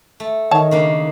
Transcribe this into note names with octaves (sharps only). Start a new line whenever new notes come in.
A3
D#3 C#5 A5
C#3 A#3 D4